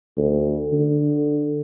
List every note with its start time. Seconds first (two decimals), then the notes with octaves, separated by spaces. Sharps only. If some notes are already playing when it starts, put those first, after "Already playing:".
0.17 D2
0.73 D3